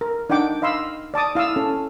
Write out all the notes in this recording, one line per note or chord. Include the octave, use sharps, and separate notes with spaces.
A#4
D4 D#4 F#5 G5 D6
D#5 F5 B5 C6 E6
D5 A5 D6 D#6
E4 F5 D#6 E6
C#4 A4